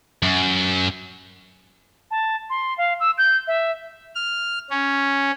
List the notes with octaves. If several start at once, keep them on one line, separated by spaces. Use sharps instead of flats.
F#2
A5
C6
F5
E6
G6
E5
F6
C#4